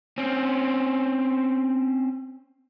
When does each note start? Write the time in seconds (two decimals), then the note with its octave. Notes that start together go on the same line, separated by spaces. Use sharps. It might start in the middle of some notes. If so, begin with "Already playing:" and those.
0.18 C4 C#4